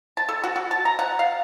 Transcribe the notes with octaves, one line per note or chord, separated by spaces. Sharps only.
A5
A4
F#4
F#4
A5
A#5
F#5
F5